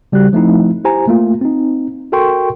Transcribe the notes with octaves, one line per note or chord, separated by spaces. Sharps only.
C#3 G3 F#4 G4 F#6
F3 A3 C4 D#4 E4
E4 G4 C5 G#5 A#5
A3 A#3 F4
C4 D#4
F#4 A4 A#4 G5 C6 C#6